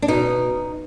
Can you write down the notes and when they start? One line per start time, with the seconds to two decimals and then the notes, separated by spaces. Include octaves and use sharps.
0.02 D4
0.08 B2 D#4